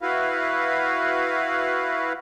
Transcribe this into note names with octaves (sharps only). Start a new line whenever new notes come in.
E4 F#4 B4 F5